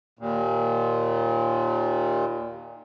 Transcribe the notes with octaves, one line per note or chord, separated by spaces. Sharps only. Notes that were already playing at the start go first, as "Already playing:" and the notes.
D#2 A#2